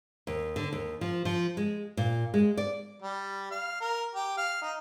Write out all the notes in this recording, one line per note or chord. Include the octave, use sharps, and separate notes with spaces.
D#2
D3
D#2
F3
F3
G#3
A#2
G#3
D5
G3
F5
A#4
G4
F5
D#4